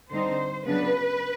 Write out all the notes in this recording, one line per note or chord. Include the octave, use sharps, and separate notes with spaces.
D3 G3 C4 D#4 C5
C#3 F#3 B3 D4 B4